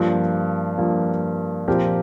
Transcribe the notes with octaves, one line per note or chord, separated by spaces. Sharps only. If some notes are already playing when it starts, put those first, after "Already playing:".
Already playing: G2 F3 A#3
G2 F3 A#3
A#2 F3 C4 G4 A#4